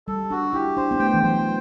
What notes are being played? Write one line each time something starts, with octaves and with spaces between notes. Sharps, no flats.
G3 A4
D4 F#4
E4 G4
D4 C5
B3
A3 G5
E3
F#3 C5